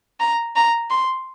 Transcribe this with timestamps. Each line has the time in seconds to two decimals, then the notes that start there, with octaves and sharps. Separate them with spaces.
0.20 A#5
0.56 A#5
0.91 C6